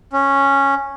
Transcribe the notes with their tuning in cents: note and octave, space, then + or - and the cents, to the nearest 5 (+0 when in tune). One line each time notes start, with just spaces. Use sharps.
C#4 -5